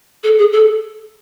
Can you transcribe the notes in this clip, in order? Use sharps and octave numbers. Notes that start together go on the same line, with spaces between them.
A4
G#4
A4